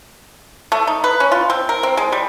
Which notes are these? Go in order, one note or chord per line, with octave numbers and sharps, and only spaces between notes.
A3
D#4
B4
C#4
F4
C4
A#4
C4
G#3
G3